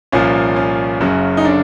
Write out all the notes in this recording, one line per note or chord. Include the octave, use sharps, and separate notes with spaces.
C2 A#2 F3 C#4
C#4
F#1 F#2 C#3
D#4
D3 D4